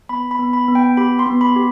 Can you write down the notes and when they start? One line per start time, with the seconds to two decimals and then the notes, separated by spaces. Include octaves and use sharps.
0.09 B3 B5
0.31 B5
0.39 B3
0.53 B5
0.68 B3
0.75 G5
0.97 G4 B5
1.19 C6
1.27 B3
1.41 B5
1.56 G4